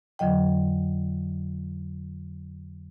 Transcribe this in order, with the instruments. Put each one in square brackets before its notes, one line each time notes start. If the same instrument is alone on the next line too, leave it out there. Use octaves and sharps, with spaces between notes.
[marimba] F2 D3 F#3 D#5 G5